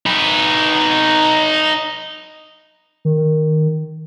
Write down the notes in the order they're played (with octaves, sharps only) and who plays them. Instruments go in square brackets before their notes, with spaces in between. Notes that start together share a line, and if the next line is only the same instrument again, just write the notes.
[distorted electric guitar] D#4 B4
[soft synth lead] D#3